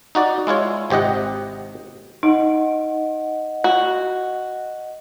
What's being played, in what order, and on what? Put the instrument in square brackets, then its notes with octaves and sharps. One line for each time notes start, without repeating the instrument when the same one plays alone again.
[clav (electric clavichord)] D#4 F#4 D5
G#3 E4 F4 C#5
G#1 C3 G4 D#5 F#5
[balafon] D#4 [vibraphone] D#5 F#5
[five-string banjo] F#4